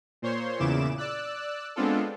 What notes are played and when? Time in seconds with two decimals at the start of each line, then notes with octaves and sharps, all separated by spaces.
0.22 A#2 C5 C#5 C6
0.60 E2 A#2 C#3 E4 D6 E7
0.98 D5 E6 F#6
1.76 G#3 B3 C4 D4 F4 A4